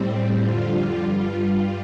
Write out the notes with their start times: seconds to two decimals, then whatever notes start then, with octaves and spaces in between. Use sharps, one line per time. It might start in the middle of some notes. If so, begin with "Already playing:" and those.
Already playing: A2 G3 C4
0.42 F2 D3 G3 F4
1.03 G2 G3 F4